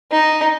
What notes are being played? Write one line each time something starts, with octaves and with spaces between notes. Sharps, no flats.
D#4